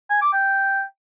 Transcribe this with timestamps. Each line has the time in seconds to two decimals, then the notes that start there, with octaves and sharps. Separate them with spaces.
0.10 G#5
0.22 D6
0.33 G5